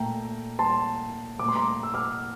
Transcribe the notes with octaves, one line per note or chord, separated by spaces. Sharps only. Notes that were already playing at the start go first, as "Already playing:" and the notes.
Already playing: A#2 A3 G5 A#5
A5 C6
A#2 A3 D6
C6
A#5 D6
E6
D6 F6